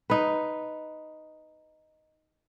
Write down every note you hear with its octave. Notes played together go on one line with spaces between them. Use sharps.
D#4 B4